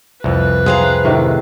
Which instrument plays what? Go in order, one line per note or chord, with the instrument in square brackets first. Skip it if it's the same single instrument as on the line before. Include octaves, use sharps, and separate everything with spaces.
[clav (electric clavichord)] C2 F2 [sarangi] B4
[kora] C4 [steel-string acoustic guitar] G#4 F5 A#5
[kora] A2 C3 D#3